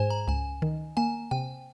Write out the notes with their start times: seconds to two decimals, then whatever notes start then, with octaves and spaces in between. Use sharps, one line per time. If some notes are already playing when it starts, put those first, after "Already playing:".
Already playing: G#2 C5 G#5
0.10 A#5
0.28 C#2 G#5
0.62 D#3
0.97 A#3 G#5
1.31 C3 G5